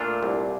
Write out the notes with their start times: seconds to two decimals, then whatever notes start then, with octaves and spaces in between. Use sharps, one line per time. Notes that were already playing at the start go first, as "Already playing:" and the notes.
Already playing: A#2 A3 D4 F4
0.23 C2